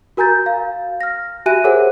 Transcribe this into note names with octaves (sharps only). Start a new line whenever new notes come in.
F#4 A#4 G#5 A#5 G6 A6
F5
F6 A#6
F#4 G4 E5 G#5 F#6 D#7
G#4 A#4 C5 C#5 F#5 G#5